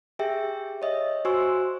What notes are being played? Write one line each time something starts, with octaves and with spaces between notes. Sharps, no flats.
G4 G#4 E5 G5
C#5 D#5 E5
F#4 C5 G#5 C#6 E6